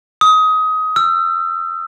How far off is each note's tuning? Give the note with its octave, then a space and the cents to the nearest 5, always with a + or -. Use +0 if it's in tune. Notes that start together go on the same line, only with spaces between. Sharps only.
D#6 +20
E6 +35